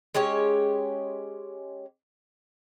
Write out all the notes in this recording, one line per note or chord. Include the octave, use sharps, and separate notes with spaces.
G#3 C#4 G4 C#5